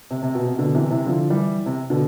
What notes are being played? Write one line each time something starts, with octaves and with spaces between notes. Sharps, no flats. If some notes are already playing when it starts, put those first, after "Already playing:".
C3
C3
B2
C3
B2 D3
C3 E3
C3 E3
D3 F3
E3 G3
C3
B2 D3